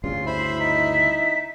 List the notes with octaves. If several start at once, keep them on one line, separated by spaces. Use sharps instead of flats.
D2 G2 C#3 F4 C7
E4 C5 B5
D#4 B6